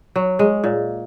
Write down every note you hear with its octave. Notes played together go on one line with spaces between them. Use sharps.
F#3
G#3
A#2